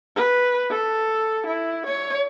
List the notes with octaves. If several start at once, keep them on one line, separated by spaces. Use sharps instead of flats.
B4
A4
E4
C#5